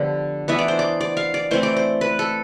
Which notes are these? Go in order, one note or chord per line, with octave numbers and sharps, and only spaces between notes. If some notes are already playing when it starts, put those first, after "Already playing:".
Already playing: D3 F3 B3 D4 G4
E3 B3 D4 E5
D5
C5
D5
D5
F5
D5
E3 A3 C4 C5
D5
C5
B4
A4